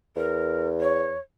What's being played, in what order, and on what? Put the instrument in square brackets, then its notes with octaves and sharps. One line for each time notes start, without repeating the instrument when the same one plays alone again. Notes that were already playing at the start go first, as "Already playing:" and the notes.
[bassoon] E2 [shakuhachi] A#4
[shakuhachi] C#5